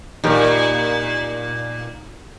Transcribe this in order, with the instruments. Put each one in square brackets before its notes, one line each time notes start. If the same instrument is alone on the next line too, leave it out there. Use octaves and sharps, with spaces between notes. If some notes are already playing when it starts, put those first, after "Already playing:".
[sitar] E2 A#2 [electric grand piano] D#4 G4 A#4